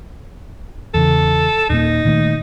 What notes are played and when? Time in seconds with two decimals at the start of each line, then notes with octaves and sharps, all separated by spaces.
0.94 E2 C#3 A4
1.70 D#2 A#2 A#3 D#4
2.05 A#2 D#3 A3